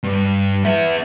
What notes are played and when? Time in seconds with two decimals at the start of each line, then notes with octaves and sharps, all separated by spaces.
0.03 G2
0.64 B3 E5